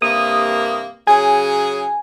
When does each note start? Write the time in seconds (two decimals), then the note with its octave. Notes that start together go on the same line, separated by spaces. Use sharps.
0.02 G2 C3 A#3 D#6
1.07 C#3 F#3 G#4 G#5